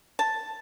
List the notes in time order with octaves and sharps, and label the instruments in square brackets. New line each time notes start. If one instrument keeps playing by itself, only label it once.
[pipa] A5